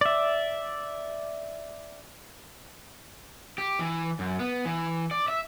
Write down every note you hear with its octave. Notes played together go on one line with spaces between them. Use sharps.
D5 E5
G4
E3
F#2
B3
E3
D5
E5